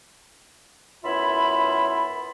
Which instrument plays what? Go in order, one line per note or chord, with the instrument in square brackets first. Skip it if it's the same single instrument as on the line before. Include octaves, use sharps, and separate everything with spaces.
[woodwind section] F#2 B3 E4 F4 E5 B5